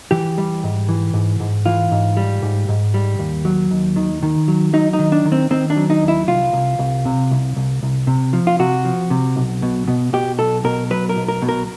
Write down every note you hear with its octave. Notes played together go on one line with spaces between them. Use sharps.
E3 G4
G3
G#2
E3
G#2
G#2
E3 F4
G#2
G3
G#2
G#2
G3
D#2
F#3
D#2
D#3
D#3
F#3
F#3 D#4
D#4
D#3
D4
D#3
C4
D#3 C4
D4
F#3
D#4
D#2
E4
C2 F4
C2
C2
C3
C2
C2
C2
C3
F3
F4
C3 F#4
F3
C3
B1
B2
B2
B2 G4
B1 A4
B2 A#4
F#3 B4
A#4
B1
A#4
B2
A#4